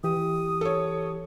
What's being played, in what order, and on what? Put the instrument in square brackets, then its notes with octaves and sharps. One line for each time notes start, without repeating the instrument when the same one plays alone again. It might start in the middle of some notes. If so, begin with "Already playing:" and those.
[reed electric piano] E3 G4 [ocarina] D#6
[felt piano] A4 C#5